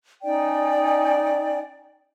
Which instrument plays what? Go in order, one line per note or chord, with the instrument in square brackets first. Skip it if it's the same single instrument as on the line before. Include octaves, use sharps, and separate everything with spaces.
[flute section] C#4 D#4 D5 G5